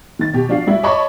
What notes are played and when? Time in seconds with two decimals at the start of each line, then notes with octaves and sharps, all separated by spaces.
0.19 D#3 A6
0.33 B2 G4
0.49 F3 D4 F#4 F5
0.67 G3 E4 F#4
0.83 C#5 D#5 A5 B5 C#6 D6